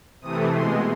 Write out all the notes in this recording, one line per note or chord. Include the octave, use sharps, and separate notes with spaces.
C3 E3 A3 D#6
B2 G#3 C6